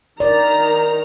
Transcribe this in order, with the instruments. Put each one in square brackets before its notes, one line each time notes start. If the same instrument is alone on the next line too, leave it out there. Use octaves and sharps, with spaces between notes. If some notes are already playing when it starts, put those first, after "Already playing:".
[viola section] D#3 A#5 [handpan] D5